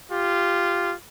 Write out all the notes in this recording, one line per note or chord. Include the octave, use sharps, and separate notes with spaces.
F4 G4